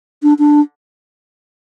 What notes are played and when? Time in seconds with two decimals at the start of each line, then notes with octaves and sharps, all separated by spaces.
0.23 D4
0.39 D4